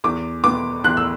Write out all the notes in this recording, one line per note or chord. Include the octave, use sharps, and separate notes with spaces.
E2 D6
B2 B3 D6
E2 F#6
E6